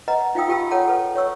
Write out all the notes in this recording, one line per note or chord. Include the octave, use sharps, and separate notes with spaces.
B4 D#5 F#5 A#5
D#4 F4 F5 G5 D#6 E6
F4 G4 G5 A5 B5 E6
A4 C#5 F#5 A5 A#5
A4 B4
C#5 C#6 E6